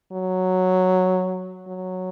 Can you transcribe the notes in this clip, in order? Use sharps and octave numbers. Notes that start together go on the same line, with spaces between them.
F#3
F#3